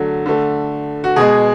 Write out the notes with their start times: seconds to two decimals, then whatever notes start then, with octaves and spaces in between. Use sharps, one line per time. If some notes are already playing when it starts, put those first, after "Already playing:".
Already playing: D3 F#3 A3
0.26 D3 A3
1.04 F#4
1.16 B2 G#3 G#4